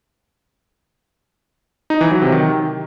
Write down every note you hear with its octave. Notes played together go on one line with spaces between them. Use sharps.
D#4
E3
F#3
C3
D#3